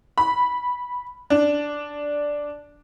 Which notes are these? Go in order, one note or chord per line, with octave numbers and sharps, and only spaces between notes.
B5
D4